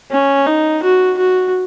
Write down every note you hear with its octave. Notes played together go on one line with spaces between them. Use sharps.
C#4
D#4
F#4
F#4